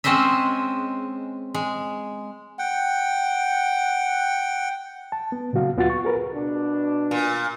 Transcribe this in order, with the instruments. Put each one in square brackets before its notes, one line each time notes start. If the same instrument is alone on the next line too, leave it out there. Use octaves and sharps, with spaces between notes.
[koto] G#3 C4 C#4 C5 D#5 E5
G#3
[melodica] F#5 G5
[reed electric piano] A5
B3
A#2 C#3 F#3 F#4 F5
D2 B3 F4 F#4 F#5 A6
C#6
G#4 A#4 B4
[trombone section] B2 D4
[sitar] A#2